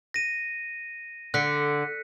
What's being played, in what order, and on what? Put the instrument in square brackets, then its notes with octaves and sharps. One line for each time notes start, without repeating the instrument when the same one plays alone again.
[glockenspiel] A#6 D#7
[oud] D3 [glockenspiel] F#6 B6 C#7